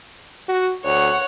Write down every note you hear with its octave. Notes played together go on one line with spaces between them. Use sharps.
F#4
D2 C#5 F#5